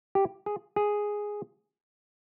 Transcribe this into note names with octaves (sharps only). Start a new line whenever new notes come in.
G4
G#4
G#4